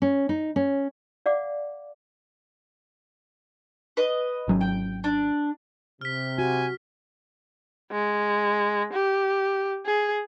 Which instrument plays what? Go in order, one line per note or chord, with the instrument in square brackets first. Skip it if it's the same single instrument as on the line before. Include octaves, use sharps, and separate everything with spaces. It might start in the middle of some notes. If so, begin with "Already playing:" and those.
[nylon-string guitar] C#4
D#4
C#4
[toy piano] D5 F5 F#5 D6
[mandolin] B4 D#5
[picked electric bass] G#1 F#3 C#4
[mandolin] G5
D4
[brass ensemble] C3 [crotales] F6 B6
[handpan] F#4 [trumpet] G#5
[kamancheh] G#3
G4
G#4